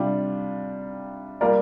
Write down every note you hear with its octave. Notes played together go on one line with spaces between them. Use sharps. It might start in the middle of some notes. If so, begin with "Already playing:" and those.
Already playing: C3 G3 D4 F4
G3 A#3 F4 A#4 D5